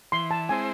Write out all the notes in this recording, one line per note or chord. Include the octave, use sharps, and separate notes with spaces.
E3 C6
A5
G#3 C4 E4 C5 G#5